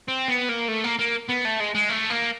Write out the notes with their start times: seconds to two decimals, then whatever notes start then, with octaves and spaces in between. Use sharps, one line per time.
0.08 C4
0.28 B3
0.49 A#3
0.68 A3
0.84 A#3
0.99 A#3
1.29 B3
1.45 A3
1.60 G#3
1.75 G#3
1.89 A3
2.10 A#3